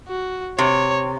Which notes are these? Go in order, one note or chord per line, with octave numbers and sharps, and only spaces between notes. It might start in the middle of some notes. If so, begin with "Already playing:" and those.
F#4
C3 C#5